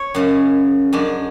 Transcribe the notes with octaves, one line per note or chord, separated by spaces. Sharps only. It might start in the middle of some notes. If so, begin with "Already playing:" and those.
Already playing: C#5
F#2 C#3 G#3
F#2 D3 G#3 D4